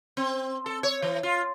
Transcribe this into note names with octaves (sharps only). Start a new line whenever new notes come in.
C4
A4
C#5
E3
F4